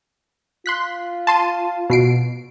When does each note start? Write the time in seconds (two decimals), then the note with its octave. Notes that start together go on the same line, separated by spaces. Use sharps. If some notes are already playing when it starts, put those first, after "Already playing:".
0.66 F4 C6 F#6 B6
1.27 A5 C6 D#7
1.90 B2 C7 D7